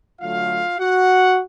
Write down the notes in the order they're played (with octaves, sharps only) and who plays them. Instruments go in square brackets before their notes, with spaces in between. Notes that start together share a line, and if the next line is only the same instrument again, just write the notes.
[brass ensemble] D3 F#3 A3 F4 F5
F#4 F#5